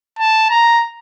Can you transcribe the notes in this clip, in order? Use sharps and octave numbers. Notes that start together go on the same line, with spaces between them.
A5
A#5